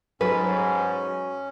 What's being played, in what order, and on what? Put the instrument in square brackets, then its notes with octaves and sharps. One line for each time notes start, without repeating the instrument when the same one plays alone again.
[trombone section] G#2 [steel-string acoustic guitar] F#3 [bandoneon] C#4 [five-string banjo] A4 B4